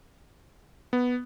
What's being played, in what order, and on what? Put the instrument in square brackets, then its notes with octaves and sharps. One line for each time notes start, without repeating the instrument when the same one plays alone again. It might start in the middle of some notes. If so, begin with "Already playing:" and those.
[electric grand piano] B3